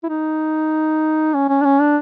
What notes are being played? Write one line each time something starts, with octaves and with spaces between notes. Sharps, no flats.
E4
D#4
C#4
C#4
D4
C#4
D4